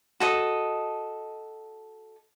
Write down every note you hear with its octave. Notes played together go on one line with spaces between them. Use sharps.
F#4 A4 D#5